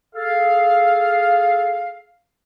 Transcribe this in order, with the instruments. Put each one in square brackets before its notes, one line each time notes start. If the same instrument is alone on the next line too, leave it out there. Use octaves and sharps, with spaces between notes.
[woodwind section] G#4 A4 F5